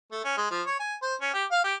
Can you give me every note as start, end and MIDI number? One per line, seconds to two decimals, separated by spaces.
0.12 0.20 57
0.24 0.37 61
0.37 0.47 56
0.51 0.61 53
0.67 0.79 73
0.79 0.95 80
1.02 1.15 72
1.21 1.33 61
1.33 1.44 67
1.51 1.63 77
1.64 1.74 67